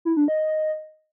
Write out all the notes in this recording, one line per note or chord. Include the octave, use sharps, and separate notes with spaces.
E4
D4
D#5